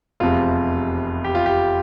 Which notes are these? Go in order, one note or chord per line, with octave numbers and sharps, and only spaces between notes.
F1 E2 C3 F3 C4 F4
G4
F4
G4